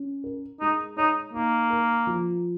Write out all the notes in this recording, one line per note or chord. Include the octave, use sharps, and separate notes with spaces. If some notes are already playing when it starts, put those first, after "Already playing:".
Already playing: C#4
A#4
G#3 D#4
D#4 C#5
A#3 D#4
A#4
F3